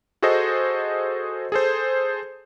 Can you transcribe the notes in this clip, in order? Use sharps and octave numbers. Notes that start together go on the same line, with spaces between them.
F#4 G#4 A4 C5 D#5
G#4 A4 C5